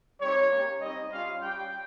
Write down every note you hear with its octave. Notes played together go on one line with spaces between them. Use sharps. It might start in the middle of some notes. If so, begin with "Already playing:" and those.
G3 C4 D#4 G4 C#5
A#3 C#4 G4
G3 C4 D#4 D#5
G3 C#4 F4 F5
G3 C#4 G4 G5